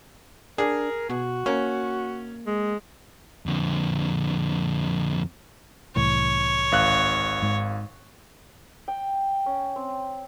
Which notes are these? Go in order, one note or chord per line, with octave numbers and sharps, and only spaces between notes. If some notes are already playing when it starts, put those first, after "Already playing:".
D4 G#4 A#4
B2 F#4
A#3 C#4
G#3
F2 D3
C2 A2 E3 C#5
G#1 F5 F#6
G#2
G5
C#4
C4